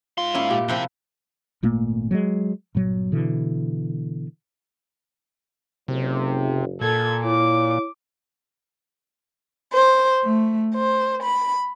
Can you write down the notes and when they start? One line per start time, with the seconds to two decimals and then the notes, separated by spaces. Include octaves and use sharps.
0.18 G#2 F4 C6
0.34 A#3 C#4 E4
0.50 A#2 G4
0.68 C3 F3 E4 F#5 G5
1.63 G#1 A#2 A3 A#3
2.11 F#3 G#3
2.75 G1 A#2 F#3
3.12 B2 D3 E3
5.88 F#1 C3
6.81 A#2 A4 G#6
7.25 E4 C#5 D6
9.73 C5
10.26 A3
10.74 C5
11.22 B5